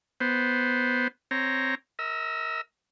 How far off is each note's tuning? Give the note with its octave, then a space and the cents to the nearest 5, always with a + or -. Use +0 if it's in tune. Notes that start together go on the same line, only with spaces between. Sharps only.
B3 +0 C5 +0
C4 +0 C#5 +0 A#5 +0
A#4 +0 D#5 +45 E6 +10